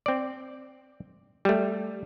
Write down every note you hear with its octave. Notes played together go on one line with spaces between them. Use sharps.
C4 D5
G3 A3